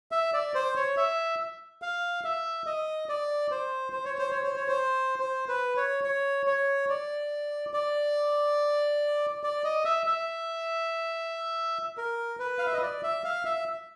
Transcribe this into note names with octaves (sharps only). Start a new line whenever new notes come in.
E5
D5
C5
C#5
E5
F5
E5
D#5
D5
C5
C5
C#5
C5
C#5
C5
C#5
C5
C5
B4
C#5
C#5
C#5
D5
D5
D5
D#5
E5
E5
A#4
B4
F5
E5
D#5
D5
E5
F5
E5